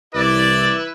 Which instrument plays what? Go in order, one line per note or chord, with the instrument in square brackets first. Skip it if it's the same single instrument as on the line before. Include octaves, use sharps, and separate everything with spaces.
[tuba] C2 [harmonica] E4 B4 [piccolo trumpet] D5